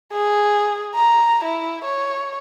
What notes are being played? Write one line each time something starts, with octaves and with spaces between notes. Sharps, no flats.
G#4
A#5
E4
C#5